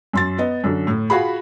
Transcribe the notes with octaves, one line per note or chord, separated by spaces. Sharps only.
F#2 C6 A6
B3 D#5
F#2 D3
A2
F4 F#4 G#4 B5